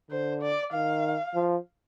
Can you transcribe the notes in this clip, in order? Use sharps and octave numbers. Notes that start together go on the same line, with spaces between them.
D3 C5
D5
D#3 F5
F3